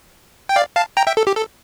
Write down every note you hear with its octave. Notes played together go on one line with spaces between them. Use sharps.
G5
D5 F5
F5 A5
G5 A#5
E5 G5
A4
G4
A4